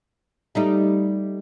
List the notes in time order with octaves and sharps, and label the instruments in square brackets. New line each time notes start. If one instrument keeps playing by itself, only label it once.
[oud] G3 A3 D#4